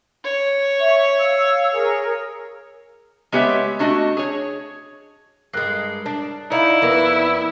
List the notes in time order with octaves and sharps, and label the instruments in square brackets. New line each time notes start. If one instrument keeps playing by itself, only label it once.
[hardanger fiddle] C#5
[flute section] E5 C#6
F5 E6
G#4 A#4
[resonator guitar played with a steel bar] G#3 B3 G4 C#5 E5
A3 D4 F#4 D#5
G#4 C#5
[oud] G2 G#3 [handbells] A#4 F#6 C7
[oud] D4
[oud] D#4 [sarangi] E4 [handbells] D5 F5
[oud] F2 B3 A#4